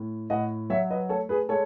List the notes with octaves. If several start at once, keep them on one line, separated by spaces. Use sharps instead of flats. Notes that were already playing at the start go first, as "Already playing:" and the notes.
Already playing: A2
A2 D#5 F#5
F#3 C#5 E5
B4 D#5
A3 A4 C#5
G#4 B4
G#3 A4 C#5